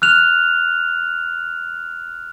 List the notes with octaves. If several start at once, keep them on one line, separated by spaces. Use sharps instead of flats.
F6 F#6 F7